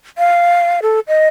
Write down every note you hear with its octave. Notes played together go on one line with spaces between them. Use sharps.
F5
A4
D#5